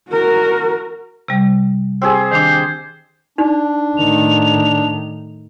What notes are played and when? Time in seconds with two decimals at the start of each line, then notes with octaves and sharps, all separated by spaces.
0.10 F#4 A#4
1.28 C3 G3
2.02 C4 G4 G#4
2.32 D#3 D4 C5
3.38 D4 D#4
3.97 A2 D#3 F7